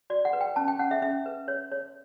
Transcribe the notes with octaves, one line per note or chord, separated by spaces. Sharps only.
F#4 D5
F#5
B4
G5
C#4 A5
G5
C#4 F#5
E5
C#4 E5
B4
C#5
C#5